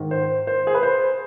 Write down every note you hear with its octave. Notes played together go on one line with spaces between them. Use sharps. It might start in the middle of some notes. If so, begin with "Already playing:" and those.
Already playing: G#2 D#3
C5
C5
G#4
B4
C5